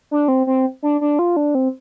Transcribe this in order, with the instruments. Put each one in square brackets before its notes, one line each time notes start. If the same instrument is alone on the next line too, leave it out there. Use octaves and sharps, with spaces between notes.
[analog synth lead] D4
C4
C4
D4
D4
F4
D4
C4